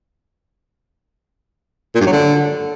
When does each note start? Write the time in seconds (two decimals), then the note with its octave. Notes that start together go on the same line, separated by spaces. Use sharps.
1.95 A#2
2.01 G2
2.07 F#3
2.12 D3